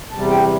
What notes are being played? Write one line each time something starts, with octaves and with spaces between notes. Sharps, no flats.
E2 C3 G3 A5
G5